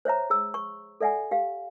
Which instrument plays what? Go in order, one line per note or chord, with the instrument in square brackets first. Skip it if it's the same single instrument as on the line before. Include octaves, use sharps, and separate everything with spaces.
[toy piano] C5 C#5 E5 A#5
G#4 E6
C#6
A4 D5 E5 F#5 G#5
G4 F5